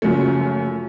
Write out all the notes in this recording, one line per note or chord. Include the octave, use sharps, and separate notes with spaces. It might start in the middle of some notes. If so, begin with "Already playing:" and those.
F#1 F#2 F3 A3